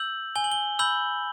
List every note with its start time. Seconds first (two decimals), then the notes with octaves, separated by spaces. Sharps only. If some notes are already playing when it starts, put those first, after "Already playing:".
Already playing: E6 G6 F#7
0.35 G#5 G7
0.44 F#7
0.52 G7
0.79 B5 E6 G6 F#7